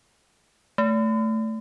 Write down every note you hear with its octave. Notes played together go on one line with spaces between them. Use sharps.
A3